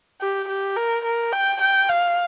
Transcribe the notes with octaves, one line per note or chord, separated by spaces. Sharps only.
G4
G4
A#4
A#4
G5
G5
F5